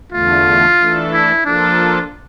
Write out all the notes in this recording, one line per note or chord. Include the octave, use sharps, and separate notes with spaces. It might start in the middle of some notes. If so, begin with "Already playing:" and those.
E2 D3 A3 F4
E3 A3 D4 A4
E4
F3 A#3 D4 F4 A4